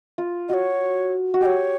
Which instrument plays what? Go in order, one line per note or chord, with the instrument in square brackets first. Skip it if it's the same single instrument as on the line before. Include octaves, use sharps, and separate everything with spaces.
[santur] F4
[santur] F#4 [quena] C#5 D#5
[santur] F#4
[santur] G4 [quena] D#5
[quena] C#5